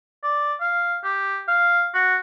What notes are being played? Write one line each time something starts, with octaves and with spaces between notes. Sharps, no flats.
D5
F5
G4
F5
F#4